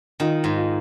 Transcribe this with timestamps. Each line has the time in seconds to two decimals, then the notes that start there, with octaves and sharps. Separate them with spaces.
0.20 D#3 D#4 F4
0.44 G#2
0.57 F4